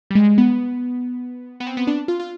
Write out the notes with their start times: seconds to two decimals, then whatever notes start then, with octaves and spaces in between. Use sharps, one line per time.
0.11 G3
0.15 G#3
0.38 B3
1.60 B3
1.67 C4
1.77 B3
1.87 D4
2.08 F4
2.20 F4